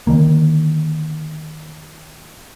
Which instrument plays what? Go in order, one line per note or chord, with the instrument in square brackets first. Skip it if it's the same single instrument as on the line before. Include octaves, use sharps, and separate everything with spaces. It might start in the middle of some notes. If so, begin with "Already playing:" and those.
[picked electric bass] D3 D#3 A#3